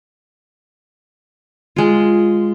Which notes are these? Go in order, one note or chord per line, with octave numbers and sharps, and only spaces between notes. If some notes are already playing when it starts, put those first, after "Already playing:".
G#3 F4